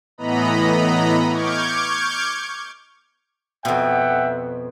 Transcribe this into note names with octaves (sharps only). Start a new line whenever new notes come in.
A2 E3 B3 D#5 A#5 B5
C#6 D6 F6 G6 G#6
F2 B2 E5 F#5 G5